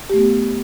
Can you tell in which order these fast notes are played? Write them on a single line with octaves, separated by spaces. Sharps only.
G4 A3 B3